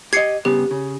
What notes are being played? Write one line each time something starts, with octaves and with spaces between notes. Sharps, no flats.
G4 D#5 G#6 C7 C#7
G2 C#3 B3 G4
C#3